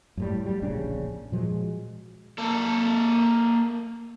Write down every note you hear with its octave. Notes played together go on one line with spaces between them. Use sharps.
F#2 A2 G3
F#3 G3
D1 A#1 C#3 D4
A#2 F3 F#3 G#3
A#3 A4